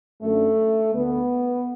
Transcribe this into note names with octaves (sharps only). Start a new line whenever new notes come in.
F#2 D3 A3
D2 D3 B3